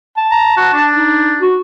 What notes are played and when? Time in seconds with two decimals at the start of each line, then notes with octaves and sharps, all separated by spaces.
0.17 A5
0.32 A#5
0.57 F#4
0.74 D4
0.96 D#4
1.41 F#4